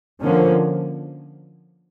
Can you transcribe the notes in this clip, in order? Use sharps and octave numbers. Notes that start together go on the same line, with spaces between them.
D3 F3 A#3 C#4